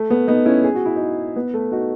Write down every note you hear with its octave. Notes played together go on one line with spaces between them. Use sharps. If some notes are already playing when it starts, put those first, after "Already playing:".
Already playing: A3
B3
B3 D#4
C#4 E4
G#4
F#4
E4
D#4 F#4
B3
A3
D#4 F#4